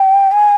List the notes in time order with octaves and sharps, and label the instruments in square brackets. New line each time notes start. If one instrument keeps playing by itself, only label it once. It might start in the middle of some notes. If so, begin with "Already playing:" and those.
Already playing: [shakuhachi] G5
G#5